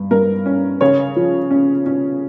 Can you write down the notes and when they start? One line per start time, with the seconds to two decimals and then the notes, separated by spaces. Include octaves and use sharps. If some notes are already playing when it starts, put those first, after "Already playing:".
Already playing: G2
0.11 G2 A#4
0.46 C#4
0.81 C#3 C#5
1.16 F3
1.51 C#4
1.86 C#4